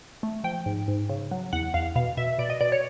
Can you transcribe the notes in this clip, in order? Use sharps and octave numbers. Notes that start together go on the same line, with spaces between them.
A3
F3 G5
G#2
G#2
C#3
F#3
E2 F#5
E2 F5
B2 F5
B2 E5
B2 D5
D#5
B2 D5
C#5